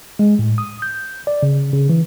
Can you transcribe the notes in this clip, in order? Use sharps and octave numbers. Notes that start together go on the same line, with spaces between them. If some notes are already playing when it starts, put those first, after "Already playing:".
G#3
A2
D#6
G6
D5
C#3
C#3
E3